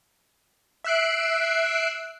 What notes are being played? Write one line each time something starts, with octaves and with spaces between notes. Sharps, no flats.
E5 E6 F#6 C7 D7